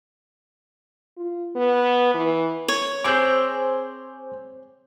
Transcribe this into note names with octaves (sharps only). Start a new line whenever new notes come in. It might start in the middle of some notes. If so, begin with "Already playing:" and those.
F4
B3
E3
C#5
C4 G#4 C5 D6 G6